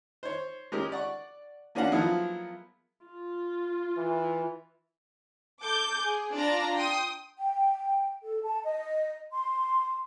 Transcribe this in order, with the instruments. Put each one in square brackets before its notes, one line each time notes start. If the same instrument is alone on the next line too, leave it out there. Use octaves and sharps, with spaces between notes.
[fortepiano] C5 C#5
G#3 C#4 G4 A#4
D5 F#5 C#6
A#3 C#4 D4 F#4 F5 F#5
F3 F#3 G#3 A#3 B3 E4
[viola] F4
[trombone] E3
[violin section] A4 D6 G6
G#4
D4 F4 D5 A#5
G5 C6 D#6
[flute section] G5
A4
A5
D#5
C6